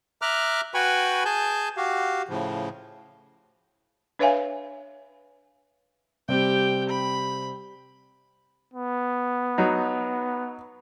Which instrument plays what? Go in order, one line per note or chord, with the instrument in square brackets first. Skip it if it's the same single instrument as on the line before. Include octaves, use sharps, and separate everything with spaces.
[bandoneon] E5 A#5 D6 F6 F#6
F#4 B4 G5 G#5 B5 C#6
G#4 G#5 A5 G6
F#4 G4 F5
A2 C#3 F3
[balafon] D4 B4 C#5 E5 F5 G#5
[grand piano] C3 G3 C4 [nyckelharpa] G4 G5
[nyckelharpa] B5
[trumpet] B3
[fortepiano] F#3 D#4